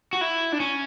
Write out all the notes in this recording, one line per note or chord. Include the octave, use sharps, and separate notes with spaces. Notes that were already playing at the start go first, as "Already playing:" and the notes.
F#4
E4
D4
C#4